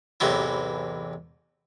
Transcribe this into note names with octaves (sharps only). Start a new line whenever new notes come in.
A1 E2 C3 F#3 D#4 E4